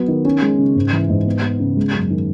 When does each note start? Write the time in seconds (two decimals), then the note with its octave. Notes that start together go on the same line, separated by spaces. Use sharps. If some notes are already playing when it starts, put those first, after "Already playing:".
Already playing: F#3 B3
0.08 D#3
0.25 C#4
0.42 G#3
0.59 C#3
0.76 G#2
0.92 E3
1.09 G#2
1.26 B3
1.43 B3
1.60 C#3
1.77 G#3
1.94 F#2
2.10 D#3